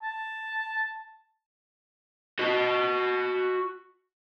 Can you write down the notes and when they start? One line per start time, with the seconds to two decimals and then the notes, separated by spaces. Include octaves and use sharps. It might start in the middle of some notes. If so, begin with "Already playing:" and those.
0.03 A5
2.39 F#4 D#5